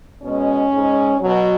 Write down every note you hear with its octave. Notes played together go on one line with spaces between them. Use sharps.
B2 G#3 C#4
G#2 G#3
B2 F#3